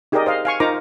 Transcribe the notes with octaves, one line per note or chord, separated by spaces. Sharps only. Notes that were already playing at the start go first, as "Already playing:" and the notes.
D#4 G4 G#4 A#4 D5 D#5
C5 D#5 F5
F5 G#5 C#6
D#4 F4 A#4 C5 A#5 D6